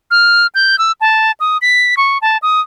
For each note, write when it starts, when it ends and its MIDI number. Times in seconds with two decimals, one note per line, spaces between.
0.11 0.47 89
0.55 0.78 91
0.79 0.92 88
1.01 1.32 81
1.40 1.58 87
1.62 1.95 95
1.97 2.18 85
2.22 2.37 81
2.42 2.61 87